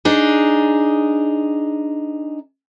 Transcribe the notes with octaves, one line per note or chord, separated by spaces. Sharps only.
D4 D#4 G#4